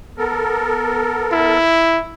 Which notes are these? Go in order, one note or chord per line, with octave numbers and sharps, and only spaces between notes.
B3 A4 A#4
E4